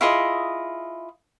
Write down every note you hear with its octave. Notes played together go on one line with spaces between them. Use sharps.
E4 F4 G#4 D#5